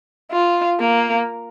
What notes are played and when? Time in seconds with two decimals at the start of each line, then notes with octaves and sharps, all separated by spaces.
0.31 F4
0.80 A#3